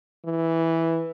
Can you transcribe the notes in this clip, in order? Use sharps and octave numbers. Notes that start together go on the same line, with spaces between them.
E3